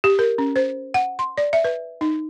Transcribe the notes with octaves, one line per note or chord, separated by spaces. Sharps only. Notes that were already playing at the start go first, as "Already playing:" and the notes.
G4
A#4
C#4
C5
F#5
C6
D5
E5
B4
D#4